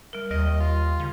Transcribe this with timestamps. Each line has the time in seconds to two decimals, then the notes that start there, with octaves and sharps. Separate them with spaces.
0.13 G3 A#4
0.31 D#2 G3 D#5
0.60 F4
1.00 C#3